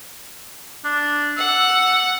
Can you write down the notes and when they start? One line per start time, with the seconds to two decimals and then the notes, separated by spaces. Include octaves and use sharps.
0.85 D4
1.37 F#5 E6